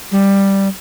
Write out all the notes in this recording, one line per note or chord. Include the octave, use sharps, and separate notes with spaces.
G3